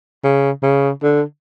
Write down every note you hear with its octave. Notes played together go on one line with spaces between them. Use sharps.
C#3
C#3
D3